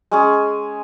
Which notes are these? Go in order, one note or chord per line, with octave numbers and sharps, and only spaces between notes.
G#3 C#4 G#4